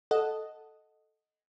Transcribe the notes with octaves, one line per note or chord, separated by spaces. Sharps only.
A4 D#5 F#5